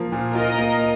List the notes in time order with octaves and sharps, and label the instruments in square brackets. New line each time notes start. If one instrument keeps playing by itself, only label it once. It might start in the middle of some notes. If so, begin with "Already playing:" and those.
Already playing: [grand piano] F3 A#3 F4
A#2
[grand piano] F4 [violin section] A#4 D#5
[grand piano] A#3